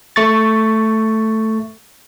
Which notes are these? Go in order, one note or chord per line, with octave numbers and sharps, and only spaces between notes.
A3 C#6 A6